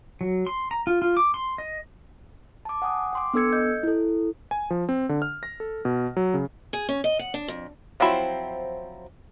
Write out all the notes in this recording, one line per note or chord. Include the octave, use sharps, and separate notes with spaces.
F#3
C6
A#5
F4
F4
D6
C6
D#5
A5 D6
F#5 G#5 D#6
G5 C6 D6
B3 D4 A4 E6 G#6 C#7
D#5 G6
E4 A4
G#5
F3
C4
D3
F6
A#6
A4
B2
F#3
C#3
G#4
C#4
D#5
F#5
D4
F2
F3 F#3 C4 E4